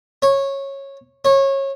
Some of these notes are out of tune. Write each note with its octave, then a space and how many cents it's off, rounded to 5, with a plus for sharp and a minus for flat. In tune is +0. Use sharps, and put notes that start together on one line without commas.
C#5 -15
C#5 -25